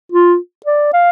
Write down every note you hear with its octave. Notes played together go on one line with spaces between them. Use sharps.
F4
D5
F5